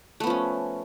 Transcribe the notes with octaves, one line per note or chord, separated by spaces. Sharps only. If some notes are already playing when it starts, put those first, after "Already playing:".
F3 A3 B3 C#4